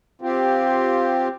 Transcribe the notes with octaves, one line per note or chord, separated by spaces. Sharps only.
C4 F4 G4